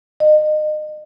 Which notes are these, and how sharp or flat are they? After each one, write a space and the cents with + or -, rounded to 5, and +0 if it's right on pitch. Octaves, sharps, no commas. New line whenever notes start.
D#5 -35